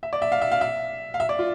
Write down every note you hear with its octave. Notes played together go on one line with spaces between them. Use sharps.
E5
D5
E5
F5
E5
F5
E5
F5
E5
D5
F4